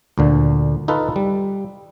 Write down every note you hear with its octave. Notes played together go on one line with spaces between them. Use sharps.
D2 A#2 D3
D#4 F4 A4 B4
G3